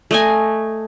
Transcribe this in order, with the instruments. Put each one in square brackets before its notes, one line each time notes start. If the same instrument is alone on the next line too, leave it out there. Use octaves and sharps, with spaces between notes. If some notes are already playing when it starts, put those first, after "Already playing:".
[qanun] A3 D#5 G#5